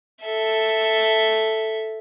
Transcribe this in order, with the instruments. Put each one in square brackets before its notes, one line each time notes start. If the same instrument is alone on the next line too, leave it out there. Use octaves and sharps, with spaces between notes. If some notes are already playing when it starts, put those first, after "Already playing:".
[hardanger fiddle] A4 E5